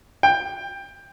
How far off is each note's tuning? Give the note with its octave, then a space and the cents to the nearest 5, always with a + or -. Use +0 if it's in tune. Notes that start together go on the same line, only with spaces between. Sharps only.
G5 +15